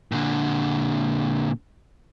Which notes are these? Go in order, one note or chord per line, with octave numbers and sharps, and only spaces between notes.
A#2 D3